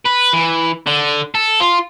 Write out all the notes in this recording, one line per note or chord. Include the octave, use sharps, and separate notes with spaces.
B4
E3
D3
A4
F4